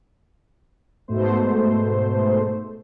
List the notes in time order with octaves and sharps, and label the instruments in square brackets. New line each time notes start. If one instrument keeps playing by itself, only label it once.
[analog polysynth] G#2 B2 A3 C5